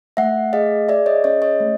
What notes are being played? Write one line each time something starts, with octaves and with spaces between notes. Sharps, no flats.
A3 E5 F#5
G#4 D#5 F5
G#4 D5 E5
C#5 D#5
C#4 C#5 D#5
C#5 D#5
A3